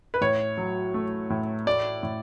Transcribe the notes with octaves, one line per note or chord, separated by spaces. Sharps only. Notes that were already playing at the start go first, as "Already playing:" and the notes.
B4
A2 C#5
F#3
A3
A2
A3 D5
A2